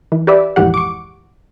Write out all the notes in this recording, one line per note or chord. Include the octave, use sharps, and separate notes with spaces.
E3
G4 B4 D5 E5
A#1 F2 G#2 E3 G4 F#5
C#6 D6